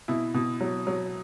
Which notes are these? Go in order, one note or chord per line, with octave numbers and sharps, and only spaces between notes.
B2 E4
B2
F#3
F#3